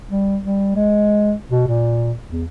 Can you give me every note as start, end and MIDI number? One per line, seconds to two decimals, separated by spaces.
0.11 0.37 55
0.43 0.74 55
0.76 1.33 56
1.50 1.64 47
1.67 2.13 46
2.30 2.45 40